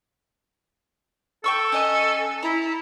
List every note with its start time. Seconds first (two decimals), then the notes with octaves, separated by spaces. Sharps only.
1.44 A4 G5 C#6 E6
1.72 C#4 D#5 G#5 F#6
2.43 E4 A#5